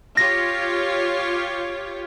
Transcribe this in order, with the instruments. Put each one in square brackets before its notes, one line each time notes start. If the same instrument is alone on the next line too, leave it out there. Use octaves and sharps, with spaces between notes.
[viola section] F4 G4 C#5 [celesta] A#6